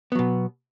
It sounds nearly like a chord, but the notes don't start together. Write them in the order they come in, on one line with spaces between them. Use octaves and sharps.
B3 F#3 B2